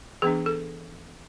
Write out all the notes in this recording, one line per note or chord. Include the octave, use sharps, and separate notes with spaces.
E3 B3 D4 G#4
A4